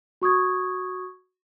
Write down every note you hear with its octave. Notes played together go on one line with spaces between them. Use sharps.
F#4 C#6 D#6 G#6